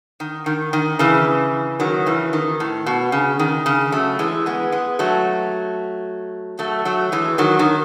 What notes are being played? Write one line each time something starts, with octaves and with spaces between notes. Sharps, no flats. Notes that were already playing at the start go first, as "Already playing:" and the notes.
D#3
D#3
D#3
C#3 E3
D#3 F#3
C#3 E3
D#3
A2
B2
C#3
D#3
C#3
F#3 A3
E3 G#3
G#3 B3
G#3 B3
F#3 A3
F#3 A3
F#3 A3
E3 G#3
D#3 F#3
D#3